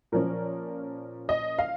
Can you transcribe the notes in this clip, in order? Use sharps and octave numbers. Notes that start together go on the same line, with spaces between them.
A#2 F3 C#4 A#4
D#5
F5